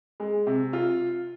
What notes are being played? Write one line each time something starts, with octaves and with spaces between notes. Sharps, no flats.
G#3
C3
F4